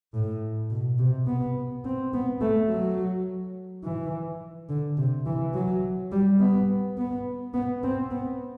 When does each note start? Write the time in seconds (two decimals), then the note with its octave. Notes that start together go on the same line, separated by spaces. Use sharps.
0.14 A2
0.71 B2
0.99 C3
1.27 B3
1.85 C4
2.13 B3
2.41 A3
2.69 F#3
3.84 E3
4.70 D3
4.98 C3
5.26 E3
5.54 F#3
6.12 G3
6.40 B3
6.98 B3
7.54 B3
7.83 C4
8.11 B3